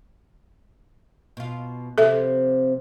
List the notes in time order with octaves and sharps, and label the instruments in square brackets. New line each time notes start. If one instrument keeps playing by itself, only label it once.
[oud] B2 F4
[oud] C3 F3 G3 [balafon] A4 E5